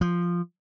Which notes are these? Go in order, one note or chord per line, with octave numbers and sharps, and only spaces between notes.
F3